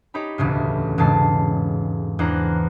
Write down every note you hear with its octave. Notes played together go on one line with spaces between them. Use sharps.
D#4 G4 C#5 B5
E1 D2 A2 C#3
E1 G#2 C#3 A5 C7
E2 D4 C5 A#5 F#6